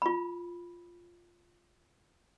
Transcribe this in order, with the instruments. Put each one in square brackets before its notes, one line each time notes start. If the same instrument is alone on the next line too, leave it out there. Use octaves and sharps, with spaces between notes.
[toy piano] F4 B5